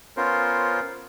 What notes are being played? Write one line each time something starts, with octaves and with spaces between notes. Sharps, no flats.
B3 C#4 F4 A#4 C5